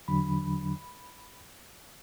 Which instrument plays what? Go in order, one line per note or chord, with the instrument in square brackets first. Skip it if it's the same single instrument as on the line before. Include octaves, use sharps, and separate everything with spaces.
[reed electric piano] E2 D3 F#3 D4 B5